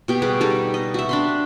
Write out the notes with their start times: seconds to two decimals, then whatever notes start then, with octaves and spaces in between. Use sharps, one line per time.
0.08 B2 G4 G5
0.22 G3 G4 G#4 B4
0.41 G3 D#4 A4
0.74 D#5
0.94 F#4 E5
1.09 D4 B5 C6